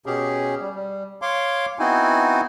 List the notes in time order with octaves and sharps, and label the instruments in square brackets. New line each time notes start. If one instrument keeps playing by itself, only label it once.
[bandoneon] B2 C#4 G4 G#4
G3
G3
C#5 F5 C6 D6
B3 C4 D#4 E4 F#4 G#5